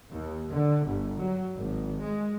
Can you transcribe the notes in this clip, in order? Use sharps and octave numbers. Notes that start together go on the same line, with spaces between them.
D#2
D3
G1
F#3
G#1
G#3